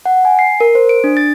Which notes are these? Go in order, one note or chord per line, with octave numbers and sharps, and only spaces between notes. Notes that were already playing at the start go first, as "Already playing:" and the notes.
F#5
G#5
C7
A#4
C5
D7
D4
A6